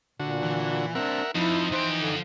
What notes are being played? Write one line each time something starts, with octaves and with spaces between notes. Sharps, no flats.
A#2 D3 F#4
E3
C4 D4 A#4 E5 F#5
F2 F3 D#4 E4
E3 F3 E4 C5 G5
D3